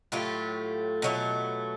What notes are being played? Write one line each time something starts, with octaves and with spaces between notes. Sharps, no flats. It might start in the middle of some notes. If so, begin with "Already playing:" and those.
A2 F#3 A3 F4 G4
B2 F#3 A3